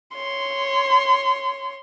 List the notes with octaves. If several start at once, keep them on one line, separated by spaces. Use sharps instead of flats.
C#5 C6